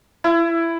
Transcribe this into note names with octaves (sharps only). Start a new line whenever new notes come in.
E4